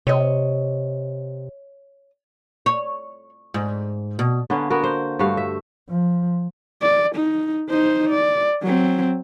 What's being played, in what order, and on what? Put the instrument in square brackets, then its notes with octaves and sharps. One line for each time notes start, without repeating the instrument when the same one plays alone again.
[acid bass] C3 [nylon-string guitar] C#5 D#5
[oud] C#5
G#2
B2
[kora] D3 A#3 B3 C#4
A#3 B3 F#4 A#4
C5
G2 A3 F#4 F5
E5
[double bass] F3
[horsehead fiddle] D5
D#4
D#4 C5
D5
F#3 C4